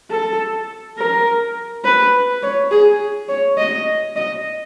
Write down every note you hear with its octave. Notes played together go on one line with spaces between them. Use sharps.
A4
A#4
B4
C#5
G#4
C#5
D#5
D#5